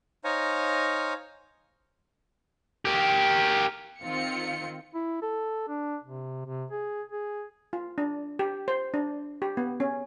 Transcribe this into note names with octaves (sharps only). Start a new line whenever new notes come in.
D#4 C5 C#5 F5 G#5 A#5
G4 A#4
D#3 C4 F4 C#7
E4
A4
D4
C3
C3
G#4
G#4
F4
D4
G4
C5
D4
G4
B3
C#4